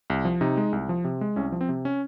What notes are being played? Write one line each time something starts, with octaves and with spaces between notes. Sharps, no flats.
C2
F3
C3 D#4
G#3
C2
F3
C3
G#3
C2 C#4
F3
C4
C3
C#4